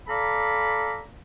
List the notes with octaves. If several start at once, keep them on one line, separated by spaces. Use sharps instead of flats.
A4 D5 F5 A#5 B5